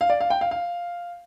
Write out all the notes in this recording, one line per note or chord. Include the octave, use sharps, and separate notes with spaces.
F5
D5
F5
G5
F5
F5